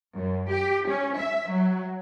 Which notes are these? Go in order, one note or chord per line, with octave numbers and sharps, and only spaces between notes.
F#2
G4
C#4
E5
F#3